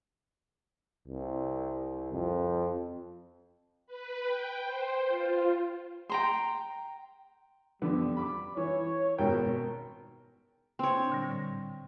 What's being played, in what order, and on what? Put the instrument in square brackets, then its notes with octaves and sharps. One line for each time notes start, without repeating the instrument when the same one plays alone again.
[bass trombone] C2
F2
[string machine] B4
G5
C5
F4
[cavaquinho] G5 A#5 C6
[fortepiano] F2 D3 B3 [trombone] G3
[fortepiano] B5 D6
[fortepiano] E3 [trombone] C#5
[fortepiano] G#1 B2 G5 [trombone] A#4
[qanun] C4 C#5
[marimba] D4
A#2 D3 G3
A2 G3